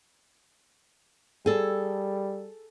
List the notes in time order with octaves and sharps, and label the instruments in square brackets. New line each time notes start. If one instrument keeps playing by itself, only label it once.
[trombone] G3 [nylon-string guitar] G#4 A4